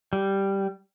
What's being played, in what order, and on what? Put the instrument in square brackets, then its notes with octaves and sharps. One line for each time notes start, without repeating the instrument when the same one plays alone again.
[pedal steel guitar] G3